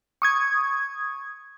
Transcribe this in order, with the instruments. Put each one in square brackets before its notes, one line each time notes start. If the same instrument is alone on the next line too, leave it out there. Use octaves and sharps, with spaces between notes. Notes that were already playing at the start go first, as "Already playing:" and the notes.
[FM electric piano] C#6 D#6 G#6